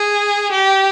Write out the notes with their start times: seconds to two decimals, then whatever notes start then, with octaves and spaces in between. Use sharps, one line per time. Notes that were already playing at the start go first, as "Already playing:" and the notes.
Already playing: G#4
0.51 G4